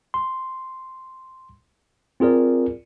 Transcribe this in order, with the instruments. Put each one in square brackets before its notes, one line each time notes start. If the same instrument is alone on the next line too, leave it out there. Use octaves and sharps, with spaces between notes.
[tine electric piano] C6
C4 F4 G#4 A#4 D5